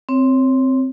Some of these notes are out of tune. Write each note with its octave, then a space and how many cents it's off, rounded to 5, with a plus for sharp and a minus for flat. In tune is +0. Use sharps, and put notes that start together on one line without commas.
C4 +0 C#5 +0